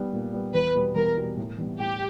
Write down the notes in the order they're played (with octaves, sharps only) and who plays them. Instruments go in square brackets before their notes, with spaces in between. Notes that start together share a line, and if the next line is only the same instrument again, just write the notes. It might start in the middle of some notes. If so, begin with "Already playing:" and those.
Already playing: [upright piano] G3 B3
A#2
G3 B3
[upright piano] E2 [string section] B4
[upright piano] B2 G3 B3
[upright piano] E2 [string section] A#4
[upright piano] B2 G3 B3
A2
E3 G3 B3
[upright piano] A2 [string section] G4